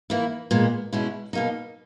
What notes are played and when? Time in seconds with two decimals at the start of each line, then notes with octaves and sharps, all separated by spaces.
0.10 E3 A#3 E4
0.51 A#2 G#3 B3
0.93 B2 G#3 C#4 E4
1.33 B2 A#3 D#4